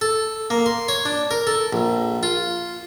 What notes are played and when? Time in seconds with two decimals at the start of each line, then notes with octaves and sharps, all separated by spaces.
0.01 A4
0.50 A#3
0.66 C6
0.88 C#5
1.05 D4
1.31 A#4
1.47 A4
1.73 A#1
2.23 F4